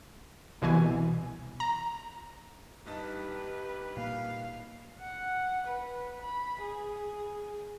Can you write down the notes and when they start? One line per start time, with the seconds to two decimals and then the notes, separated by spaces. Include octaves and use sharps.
0.62 C2 B2 E3 G#5
1.60 A#5
2.86 G2 D#4 G4 B4 A5
3.97 A#2 A#3 F5
5.01 F#5
5.67 B4
6.22 B5
6.62 G#4